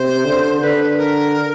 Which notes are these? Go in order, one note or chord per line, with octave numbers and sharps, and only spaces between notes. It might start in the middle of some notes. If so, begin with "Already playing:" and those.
Already playing: C3 C5
D3
D3 B4
A#4